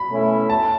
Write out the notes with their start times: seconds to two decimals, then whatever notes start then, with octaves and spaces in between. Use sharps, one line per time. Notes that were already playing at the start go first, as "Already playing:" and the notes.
Already playing: B5
0.09 B2 A3 C#4 E4
0.50 A5